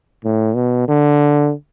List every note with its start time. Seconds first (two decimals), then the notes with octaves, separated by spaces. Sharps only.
0.25 A2
0.56 B2
0.88 D3